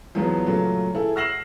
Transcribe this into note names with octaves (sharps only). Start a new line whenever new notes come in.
E2 F3 F#3 G#3 B3
A#2 C#3 F#3 A3
E4 G#4 A4
E6 F6 A#6 C7 E7 F#7